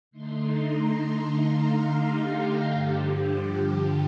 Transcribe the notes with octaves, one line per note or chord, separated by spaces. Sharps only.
D3 A3 D#4 C6
A#5
A#5
F5
G4
G2 D3 F3 G4
G4